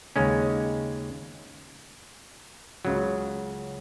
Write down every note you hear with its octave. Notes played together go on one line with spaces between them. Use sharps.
D#2 C#3 G#3 C#4
C#2 C#3 F#3